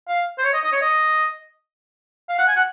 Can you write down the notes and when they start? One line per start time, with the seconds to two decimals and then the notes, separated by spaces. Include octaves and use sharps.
0.08 F5
0.38 C5
0.44 C#5
0.53 D#5
0.63 D#5
0.72 C#5
0.81 D#5
2.29 F5
2.38 F#5
2.48 G#5
2.56 F#5